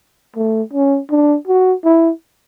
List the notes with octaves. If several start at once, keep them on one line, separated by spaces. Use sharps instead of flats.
A3
C#4
D4
F#4
E4